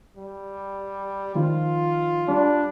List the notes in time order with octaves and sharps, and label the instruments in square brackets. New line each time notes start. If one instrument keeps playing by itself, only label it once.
[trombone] G3
[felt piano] D#3 F3 [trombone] F4
[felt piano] G3 [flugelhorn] D4